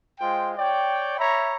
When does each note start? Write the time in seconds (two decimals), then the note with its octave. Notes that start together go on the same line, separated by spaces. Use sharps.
0.20 G#3 F4 C5 G5
0.57 C#5 D5 G5
1.18 C#5 E5 A#5 B5